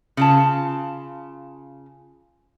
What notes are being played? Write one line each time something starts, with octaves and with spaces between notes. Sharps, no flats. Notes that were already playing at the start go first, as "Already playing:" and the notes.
C#3 F4 A5